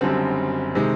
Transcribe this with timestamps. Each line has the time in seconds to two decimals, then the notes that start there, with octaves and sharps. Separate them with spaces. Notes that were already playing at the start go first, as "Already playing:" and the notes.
0.01 F#1 F#2 D3 G3 C4
0.75 C3 D#3 G#3